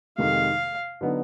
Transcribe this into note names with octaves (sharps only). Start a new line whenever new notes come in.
F2 C3 D#3 G#3 F5
D3 F#3 B3 D#4